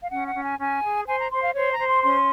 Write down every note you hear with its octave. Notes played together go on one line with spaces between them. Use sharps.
F5
C#4 F#5
F#5
C#4
G#5
C#4 G#5
G#4
C5 G#5
A#5
C5 C6
F5
C5 C#5
A#5
C5
C6
C#4 C6